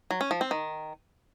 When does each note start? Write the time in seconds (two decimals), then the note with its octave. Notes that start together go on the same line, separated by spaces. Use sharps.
0.11 F#3
0.21 C#4
0.31 F3
0.41 C4
0.51 D#3